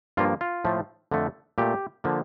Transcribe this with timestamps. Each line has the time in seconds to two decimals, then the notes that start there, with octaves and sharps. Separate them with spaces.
0.17 G2 F3 A#3 F4
0.41 F4
0.64 A2 F3 A3
1.11 F2 D3 F3 A3
1.58 A#2 A3 G4
2.04 D3 F3 A#3